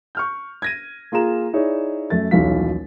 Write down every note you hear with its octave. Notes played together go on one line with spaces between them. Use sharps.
C#6 F6 G6
G#6 A#6 D#7
A#3 F4 G#4 A#5 E7
D#4 E4 G#4 C#5 D5
F#2 A3 A6
D#1 B1 E3 F#3 F5 B6